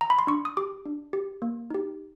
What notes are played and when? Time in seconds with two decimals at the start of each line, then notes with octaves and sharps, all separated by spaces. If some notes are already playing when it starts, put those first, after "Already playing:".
0.01 A#5
0.10 B5
0.19 C6
0.27 D4 C#6
0.45 D#6
0.57 G4 D6
0.86 D4
1.13 G4
1.42 A#3
1.70 D#4 G4